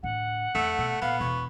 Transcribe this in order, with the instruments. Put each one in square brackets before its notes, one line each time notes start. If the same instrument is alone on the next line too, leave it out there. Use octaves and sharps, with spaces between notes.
[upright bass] A2 D3 [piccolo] F#5
[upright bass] F2 [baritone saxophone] A3 [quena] E6
[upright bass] B2
[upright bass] A#2 [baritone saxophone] B3 [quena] F5
[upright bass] E1 [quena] C#6